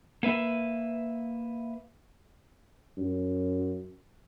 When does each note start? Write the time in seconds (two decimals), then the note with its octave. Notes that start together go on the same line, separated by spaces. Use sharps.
0.23 A#3 B4 E5
2.97 F#2